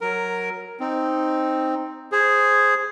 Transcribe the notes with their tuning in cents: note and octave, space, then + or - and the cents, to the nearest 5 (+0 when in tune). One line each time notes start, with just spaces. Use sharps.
F#3 +0 A#4 +0
C4 +0 D#4 +0
G#4 +0 C5 +0